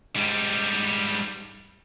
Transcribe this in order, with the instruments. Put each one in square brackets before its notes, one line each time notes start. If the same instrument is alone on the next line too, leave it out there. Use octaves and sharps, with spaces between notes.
[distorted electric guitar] G#2 G3